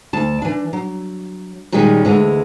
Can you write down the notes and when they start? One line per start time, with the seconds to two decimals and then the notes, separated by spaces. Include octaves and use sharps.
0.13 D2 A5
0.42 E3 D4
0.73 F#3
1.72 A#2 D#3 G3 G#3 C#4
2.05 D2 D3 E3 G#3